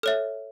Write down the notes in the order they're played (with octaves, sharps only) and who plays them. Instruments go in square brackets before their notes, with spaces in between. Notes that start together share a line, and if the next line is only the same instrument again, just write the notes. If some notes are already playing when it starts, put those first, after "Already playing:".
[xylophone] A4 C#5 E5 F6